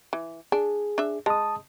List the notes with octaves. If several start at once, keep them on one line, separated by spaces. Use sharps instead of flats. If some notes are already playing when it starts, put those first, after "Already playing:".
E3
D4 G#4
D4 E5
G#3 A5 D#6